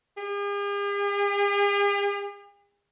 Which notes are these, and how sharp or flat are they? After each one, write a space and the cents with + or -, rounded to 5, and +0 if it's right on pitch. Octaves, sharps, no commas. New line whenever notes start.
G#4 -45